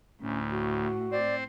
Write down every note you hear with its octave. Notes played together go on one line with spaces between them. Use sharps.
D2 A2 C#4
F#4
C4 C5 D5